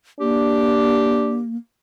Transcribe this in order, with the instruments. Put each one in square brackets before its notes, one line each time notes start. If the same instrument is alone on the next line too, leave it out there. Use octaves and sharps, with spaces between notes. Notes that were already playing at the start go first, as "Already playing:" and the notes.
[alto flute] A#3 [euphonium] D4 [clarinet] G4